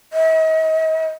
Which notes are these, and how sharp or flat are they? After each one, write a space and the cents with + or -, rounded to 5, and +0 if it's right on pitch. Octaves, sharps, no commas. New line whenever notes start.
D#5 +45